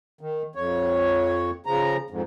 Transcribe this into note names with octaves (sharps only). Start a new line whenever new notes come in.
D#3
F2 C#5
C#3 F3 A#5
F2 G#2